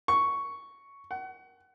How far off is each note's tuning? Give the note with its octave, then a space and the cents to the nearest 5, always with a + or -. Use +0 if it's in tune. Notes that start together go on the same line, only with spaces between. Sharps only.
C#6 +5
F#5 +30